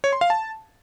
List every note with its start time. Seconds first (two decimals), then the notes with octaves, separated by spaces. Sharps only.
0.04 C#5
0.13 C6
0.21 F5
0.30 A5